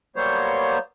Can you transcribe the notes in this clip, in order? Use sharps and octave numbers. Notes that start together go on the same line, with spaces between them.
F#3 G3 A#3 B3 C5 C#5